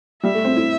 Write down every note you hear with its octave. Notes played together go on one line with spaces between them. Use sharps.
G3 E5
A3
C4
E4